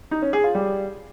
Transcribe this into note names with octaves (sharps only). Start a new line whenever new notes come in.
D#4
C#4
G#4
F4
G3